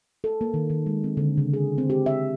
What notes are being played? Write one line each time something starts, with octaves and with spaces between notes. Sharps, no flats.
A4
A#3
D#3
D#3
G#3
C4
D3
C#3
G#4
C4
G4
E5